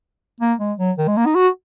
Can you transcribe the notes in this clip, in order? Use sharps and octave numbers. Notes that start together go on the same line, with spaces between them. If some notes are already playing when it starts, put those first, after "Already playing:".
A#3
G#3
F#3
D#3
G#3
A#3
D#4
F#4